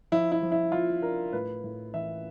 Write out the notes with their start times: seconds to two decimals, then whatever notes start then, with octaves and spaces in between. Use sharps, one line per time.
0.12 F3 E4
0.32 E4
0.42 F3
0.52 E4
0.72 F3 F4
1.02 D4 A#4
1.33 A2 B4
1.64 A2
1.94 E3 E5